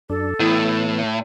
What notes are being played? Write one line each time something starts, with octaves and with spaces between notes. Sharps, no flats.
F#2 D4 A4
A2 E3 B3 E4 D#6